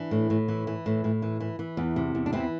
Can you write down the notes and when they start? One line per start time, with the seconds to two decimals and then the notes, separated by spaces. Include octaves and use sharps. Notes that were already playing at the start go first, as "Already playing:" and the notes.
Already playing: E3 D4
0.11 A2
0.30 A2
0.48 E3
0.67 E3
0.86 A2
1.04 A2
1.22 E3
1.40 E3
1.59 E3
1.77 E2
1.96 C3
2.15 E2
2.26 D4
2.33 E3 C4 E4